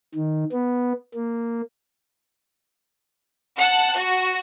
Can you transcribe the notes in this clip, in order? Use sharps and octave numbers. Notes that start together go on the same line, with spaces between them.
D#3
B3
A#3
F#5 A5 F#6
F#4